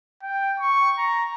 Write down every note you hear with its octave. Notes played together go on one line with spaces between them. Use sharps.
G5
C#6
A#5